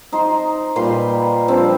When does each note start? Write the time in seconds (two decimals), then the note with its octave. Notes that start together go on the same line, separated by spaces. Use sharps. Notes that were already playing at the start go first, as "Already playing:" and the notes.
0.12 D#4 C5 C6
0.76 A#2 G3 B4 C6
1.48 F3 G3 C4 D4